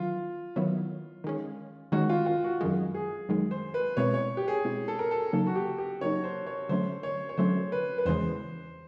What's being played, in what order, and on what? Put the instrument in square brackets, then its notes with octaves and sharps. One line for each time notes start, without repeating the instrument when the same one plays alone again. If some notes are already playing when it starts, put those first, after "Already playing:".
Already playing: [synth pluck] D#3 F#3 B3 E4 [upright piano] F4
[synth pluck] D#3 F#3 B3 E4
D#3 G#3 C#4
[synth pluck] D#3 G#3 C#4 [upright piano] F#4
[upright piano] F4
F4
F#4
[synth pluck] F#2 D#3 G#3
[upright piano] G#4
[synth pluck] F#2 D#3 G#3
[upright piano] C5
B4
[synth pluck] B2 G#3 C4 E4 [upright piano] C#5
[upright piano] C#5
G4
G#4
[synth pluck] B2 G#3 C4 E4
[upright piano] A4
A#4
A4
[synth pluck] C#3 F#3 A#3 D#4 [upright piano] A4
[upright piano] F#4
G4
G4
[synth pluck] C#3 F#3 A#3 D#4 [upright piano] C#5
[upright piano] C5
C#5
[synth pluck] D3 F#3 A3 C#4 [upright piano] C5
[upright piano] C#5
C#5
[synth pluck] D3 F#3 A3 C#4 [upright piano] C5
[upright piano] B4
B4
[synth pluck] E2 C#3 E3 G#3 [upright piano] C5